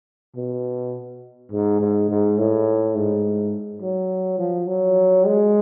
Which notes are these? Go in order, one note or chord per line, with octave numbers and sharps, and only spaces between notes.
B2
G#2
G#2
G#2
A2
G#2
F#3
F3
F#3
G#3